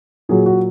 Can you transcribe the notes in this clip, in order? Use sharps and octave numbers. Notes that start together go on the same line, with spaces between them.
A#2 F#3 G#4
F#4